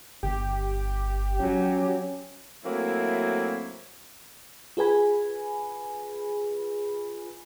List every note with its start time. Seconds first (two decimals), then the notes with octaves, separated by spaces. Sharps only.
0.23 G1 G4
1.41 F#3 C#4
2.63 F#3 A3 A#3 C4 E4
4.77 F4 G#4 B4 G#5 B5